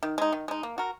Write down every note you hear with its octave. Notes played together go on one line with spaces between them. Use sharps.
D#3
G#3 D#4
D#3
G#3 D#4
A#3
F#4 A#4